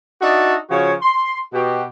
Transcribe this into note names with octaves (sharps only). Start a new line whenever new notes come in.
D4 D#4 F#4 D#5 E5 A5
C#3 F3 F#4 C#5
C6
B2 F#4 G4